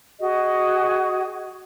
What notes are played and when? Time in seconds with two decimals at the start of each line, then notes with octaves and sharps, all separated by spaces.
0.19 F#4 G#4 D#5